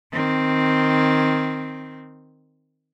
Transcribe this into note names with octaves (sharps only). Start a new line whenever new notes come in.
D#3 C4